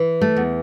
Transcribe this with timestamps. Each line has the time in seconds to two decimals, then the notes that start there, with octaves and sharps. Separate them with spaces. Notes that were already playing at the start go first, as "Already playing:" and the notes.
Already playing: E3
0.21 A3
0.36 E2